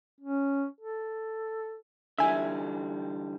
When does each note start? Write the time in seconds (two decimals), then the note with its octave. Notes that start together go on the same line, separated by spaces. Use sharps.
0.21 C#4
0.81 A4
2.18 D3 E3 G3 E5 G#5